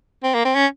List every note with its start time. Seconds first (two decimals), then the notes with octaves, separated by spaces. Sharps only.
0.24 C4
0.35 A#3
0.45 C4
0.55 C#4